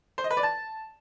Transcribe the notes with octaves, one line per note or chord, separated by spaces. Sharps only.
C5
D#5
B4
D5
A5